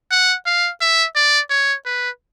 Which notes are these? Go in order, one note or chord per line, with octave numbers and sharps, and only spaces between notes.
F#5
F5
E5
D5
C#5
B4